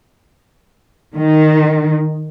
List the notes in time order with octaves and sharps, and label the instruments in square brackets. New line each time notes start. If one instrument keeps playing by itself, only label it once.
[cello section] D#3